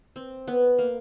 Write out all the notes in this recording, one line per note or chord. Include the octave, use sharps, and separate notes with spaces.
C4
B3
A#3